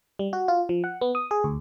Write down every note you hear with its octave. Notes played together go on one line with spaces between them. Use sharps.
G3
F#4
F4
F3
F#5
B3
D#6
G#4
D2